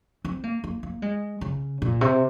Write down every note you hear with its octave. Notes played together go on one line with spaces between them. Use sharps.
C4
A#3
A#3
A#3
G#3
C#3
A#2
C3